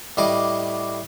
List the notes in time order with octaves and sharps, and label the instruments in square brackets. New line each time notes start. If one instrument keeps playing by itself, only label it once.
[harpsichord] A2 G3 D#5 D6